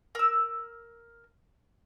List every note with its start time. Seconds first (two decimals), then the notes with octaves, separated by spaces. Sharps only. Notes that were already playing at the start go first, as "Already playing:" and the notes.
0.15 A#4 E6